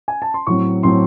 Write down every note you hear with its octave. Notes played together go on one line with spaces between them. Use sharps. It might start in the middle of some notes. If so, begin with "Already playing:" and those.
G#5
A5
C6
A2 F#3 C4 C#6
A2 F#3 C4 C6